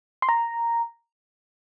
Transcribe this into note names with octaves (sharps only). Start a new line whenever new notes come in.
C6
A#5